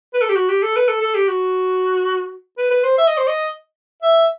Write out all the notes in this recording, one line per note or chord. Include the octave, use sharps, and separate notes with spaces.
B4
A4
G4
F#4
G4
A4
B4
A4
A4
G4
F#4
B4
B4
C5
E5
D#5
C5
D#5
E5